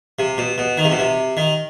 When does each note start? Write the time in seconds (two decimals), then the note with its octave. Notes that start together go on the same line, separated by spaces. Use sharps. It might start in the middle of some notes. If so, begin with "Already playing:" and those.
0.19 C3
0.38 B2
0.58 B2
0.78 D#3
0.84 C3
0.92 B2
0.99 C3
1.37 D#3